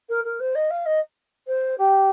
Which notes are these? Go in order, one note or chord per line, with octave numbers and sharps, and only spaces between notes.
A#4
A#4
C5
D#5
F5
D#5
C5
G4